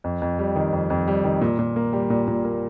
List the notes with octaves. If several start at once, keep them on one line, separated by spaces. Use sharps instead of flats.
F2
F2
G3
D#3
F2
F2
G3
D#3
A#2
A#2
A#3
G3
A#2
A#2
A#3